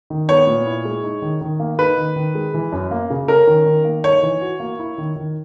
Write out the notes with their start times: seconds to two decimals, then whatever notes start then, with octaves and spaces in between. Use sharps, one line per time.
0.10 D#3
0.28 B3 C#5
0.47 A#2
0.67 E4
0.85 G#3
1.04 D#4
1.22 D#3
1.41 D#3
1.60 A#3
1.79 D#4 B4
1.98 D#3
2.16 D#3
2.35 G#3
2.54 E3
2.72 F#2
2.91 A#3
3.10 C#3
3.28 C#4 A#4
3.47 D#3
3.66 D#3
3.85 A#3
4.04 D#4 C#5
4.23 E3
4.41 F#4
4.60 A#3
4.79 E4
4.98 D#3
5.16 D#3